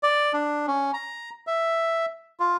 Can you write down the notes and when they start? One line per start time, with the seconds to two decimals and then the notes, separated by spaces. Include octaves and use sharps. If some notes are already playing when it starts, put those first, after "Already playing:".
0.03 D5
0.33 D4
0.67 C#4
0.94 A#5
1.47 E5
2.40 F4